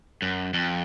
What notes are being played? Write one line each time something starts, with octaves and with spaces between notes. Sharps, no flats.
F#2
F2